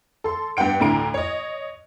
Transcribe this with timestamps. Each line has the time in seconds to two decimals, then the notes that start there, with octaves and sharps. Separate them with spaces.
0.24 A4 C6
0.57 G2 B3 F#5 G5 D7
0.80 D2 A2 D3 A#5 D7
1.14 C#5 D#5